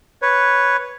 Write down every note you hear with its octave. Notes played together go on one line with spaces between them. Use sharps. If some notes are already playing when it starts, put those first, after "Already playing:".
B4 C#5